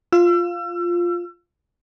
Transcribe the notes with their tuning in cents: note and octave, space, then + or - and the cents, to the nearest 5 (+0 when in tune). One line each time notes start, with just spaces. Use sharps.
F4 +0 E6 +35